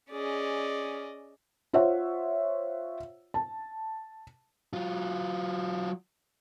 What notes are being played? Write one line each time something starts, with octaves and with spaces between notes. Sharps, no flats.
C#4 G#4 D5 D#5
F4 C5 C#5 E5 F#5
A5
F#3 F4